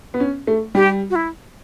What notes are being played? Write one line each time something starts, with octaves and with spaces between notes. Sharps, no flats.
B3
C#4
A3
G3 G4
F#4
E4